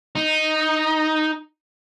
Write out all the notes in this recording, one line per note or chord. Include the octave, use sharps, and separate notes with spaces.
D#4